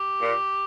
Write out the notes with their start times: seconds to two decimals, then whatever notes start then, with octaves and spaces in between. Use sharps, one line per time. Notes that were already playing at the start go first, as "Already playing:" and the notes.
Already playing: G4
0.21 A#2